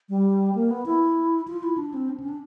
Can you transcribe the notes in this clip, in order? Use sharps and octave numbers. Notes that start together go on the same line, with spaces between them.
G3
A#3
B3
E4
F4
E4
D4
C4
D4
C#4
D4